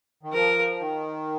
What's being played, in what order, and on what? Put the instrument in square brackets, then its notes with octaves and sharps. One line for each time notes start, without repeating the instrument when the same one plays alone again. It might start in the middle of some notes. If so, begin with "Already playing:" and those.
[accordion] D#3
[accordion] F3 [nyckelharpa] A#4
[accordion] D#3